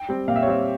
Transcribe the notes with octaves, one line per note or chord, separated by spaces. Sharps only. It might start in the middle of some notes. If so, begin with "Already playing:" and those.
Already playing: G5
G3 C4
A#2 F5
E5
C#5
G3 C4 E5